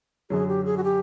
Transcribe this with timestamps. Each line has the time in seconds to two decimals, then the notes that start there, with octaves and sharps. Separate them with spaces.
0.30 F#2 D3 F#3 G#4
0.48 G4
0.65 G#4
0.77 F#4
0.84 G4